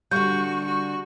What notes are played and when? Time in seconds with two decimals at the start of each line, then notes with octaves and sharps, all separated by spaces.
0.11 D3 G3 F#4 C#6 G6
0.64 F#4 C#6